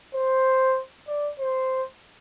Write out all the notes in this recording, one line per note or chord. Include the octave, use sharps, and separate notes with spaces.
C5
D5
C5